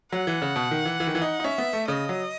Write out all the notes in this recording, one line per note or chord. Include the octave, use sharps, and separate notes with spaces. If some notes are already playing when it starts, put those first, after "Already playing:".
F#3 F#5
E3
C#3
B2
D#3
E3
E3
D#3
E3
D#4
D#4
C#4 E5
B3
A3
C#3 D#5
F#3